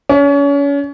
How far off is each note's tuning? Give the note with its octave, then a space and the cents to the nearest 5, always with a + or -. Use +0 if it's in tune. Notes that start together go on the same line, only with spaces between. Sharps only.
C#4 +35